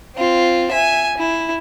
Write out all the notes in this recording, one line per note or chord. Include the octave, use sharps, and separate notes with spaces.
C4 F4
E5 G#5
E4